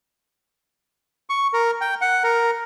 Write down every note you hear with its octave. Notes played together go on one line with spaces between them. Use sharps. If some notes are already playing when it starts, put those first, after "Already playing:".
C#6
A#4
G5
F#5
A#4